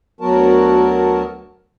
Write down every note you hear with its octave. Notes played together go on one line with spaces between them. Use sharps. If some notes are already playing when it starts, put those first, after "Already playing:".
D2 F#3 B3 F#4 A#4 A5